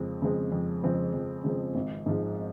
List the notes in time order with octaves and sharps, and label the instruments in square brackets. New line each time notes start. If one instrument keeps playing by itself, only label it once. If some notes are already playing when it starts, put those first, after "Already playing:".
Already playing: [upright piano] F2 C#3 F3 G#3 C4
C#3 F3 G#3 C4
F2
C#3 F3 G#3 C4
F2
C#3 F3 G#3 C4
G#1
G#2 F3 G#3